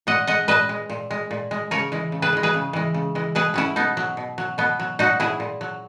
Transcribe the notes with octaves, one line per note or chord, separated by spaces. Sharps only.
A#2 D#5 F#5
G#3 D#5 F#5
A#2 B4 D#5
G#3
A#2
G#3
A#2
G#3
C#3 A#4 C#5
E3 G#3
C#3
G#4 B4
E3 G#3
G#4 B4
C#3
E3 G#3
C#3
E3 G#3
B2 G#4 B4
F#3 C#4 E4
B2 B3 D#4
F#3
B2
F#3
B2 B3
F#3
A#2 D#4 F#4
F#3 E4 G#4
A#2
F#3